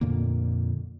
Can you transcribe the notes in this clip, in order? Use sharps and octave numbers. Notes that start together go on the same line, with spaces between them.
F2 A#2 D3 A#3